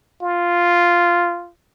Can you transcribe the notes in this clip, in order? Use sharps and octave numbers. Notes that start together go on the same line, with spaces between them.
F4